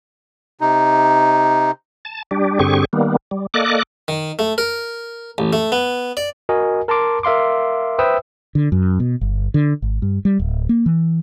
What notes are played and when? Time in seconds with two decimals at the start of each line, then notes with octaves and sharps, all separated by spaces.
0.61 C3 D#4
2.05 A5
2.31 G3 D4 G4
2.59 G2 D3 C4 G4 G#4 C#6
2.93 D#3 G3 A#3 B3
3.31 G3
3.54 A#3 A4 D5 D#5 D6 F#6
4.08 D#3
4.39 A3
4.58 A#4
5.38 A1
5.53 A3
5.72 B3
6.17 D5
6.49 F#4 A#4 D#5 G#5
6.88 A#4 A5 A#5 C6 D6
7.23 A#4 E5 F5 C6 D6
7.99 B4 C5 E5 G5 D#6 E6
8.55 D3
8.72 F#2
9.00 B2
9.21 G1
9.54 D3
9.82 G#1
10.02 G2
10.25 G3
10.40 D1
10.69 A#3
10.86 E3